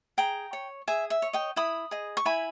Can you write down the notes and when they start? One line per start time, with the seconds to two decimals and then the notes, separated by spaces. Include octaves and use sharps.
0.18 G#4 G5 A#5
0.53 C#5
0.88 G#4 E5 G#5
1.10 E5
1.22 C#5
1.33 D#5 G5
1.56 E4 B5 D#6
1.91 G#4 D#5
2.17 C#6
2.25 E4 G#5 B5